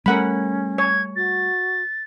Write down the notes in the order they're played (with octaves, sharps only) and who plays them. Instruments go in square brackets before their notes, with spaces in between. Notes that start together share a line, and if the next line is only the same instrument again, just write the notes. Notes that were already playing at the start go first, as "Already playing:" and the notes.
[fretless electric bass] G3 A3 [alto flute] C#4 [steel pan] A#4 F#5 B5
[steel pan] C#5 [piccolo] G#6
[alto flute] F#4 [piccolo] A6